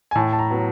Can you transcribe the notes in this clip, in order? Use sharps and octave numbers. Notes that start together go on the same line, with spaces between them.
G#5
A2 A5
A5
A#5
F#3 B3